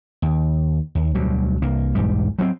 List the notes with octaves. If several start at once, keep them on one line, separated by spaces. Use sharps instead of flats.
D#2
D#2
D2 B2 F#3 G3
C2 A#3
B1 E2 G#2 G3
F#3 A#3 C4